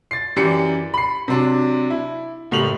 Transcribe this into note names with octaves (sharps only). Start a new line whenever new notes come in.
A6 C7
F#2 E3 G4 D5 C#7
B5 C7
C3 F#3 D4
E4
F#1 A2 G3 F7 F#7